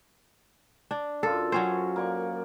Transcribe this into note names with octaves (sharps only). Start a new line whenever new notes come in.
D4
F#2 F4 A4
F#3 C#4 C5
A#3 D5 C#6